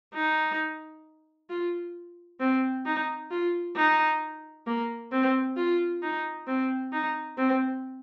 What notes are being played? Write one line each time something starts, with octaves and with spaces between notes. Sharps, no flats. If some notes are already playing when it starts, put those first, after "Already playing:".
D#4
F4
C4
D#4
F4
D#4
A#3
C4
F4
D#4
C4
D#4
C4